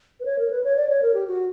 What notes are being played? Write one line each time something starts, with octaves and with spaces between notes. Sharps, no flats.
B4
C#5
A#4
B4
C#5
D5
C#5
A#4
G4
F#4